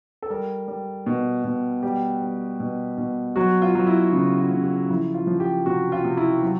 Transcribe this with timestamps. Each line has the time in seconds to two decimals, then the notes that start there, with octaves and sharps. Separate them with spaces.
0.22 A4
0.30 G3 A#4
0.68 G3
1.06 B2
1.44 B2
1.83 G3 G4
2.22 G3
2.60 B2
2.98 B2
3.36 F#3 F#4
3.62 F4
3.75 F#3
3.87 E4
4.12 C#3 E4
4.38 F4
4.51 C#3
4.64 F#4
4.90 F3 E4
5.14 F4
5.27 F3
5.40 G4
5.66 C3 F#4
5.92 F4
6.05 C3
6.17 E4
6.43 F#3